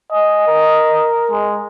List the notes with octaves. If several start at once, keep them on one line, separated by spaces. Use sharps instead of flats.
D#5 G#5
A#4
G#3